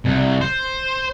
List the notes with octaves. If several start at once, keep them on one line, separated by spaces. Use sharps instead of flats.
C2
C5